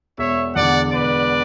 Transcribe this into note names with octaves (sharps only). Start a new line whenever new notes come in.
E1 C#5 E5
E2 D3 D5 F#5
E1 B4 D5